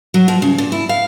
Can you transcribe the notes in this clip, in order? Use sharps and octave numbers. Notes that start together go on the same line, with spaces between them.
F#3
F3
C#3
A#2
E4
F5